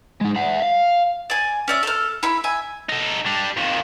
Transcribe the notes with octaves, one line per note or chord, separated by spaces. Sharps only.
G#3 D#4
E5 F#5
F5
D5 G#5
C#4 D5 E5
A4 F6
E4 B5
E5 G#5
D#4 A4
G3 D4
F2 D#3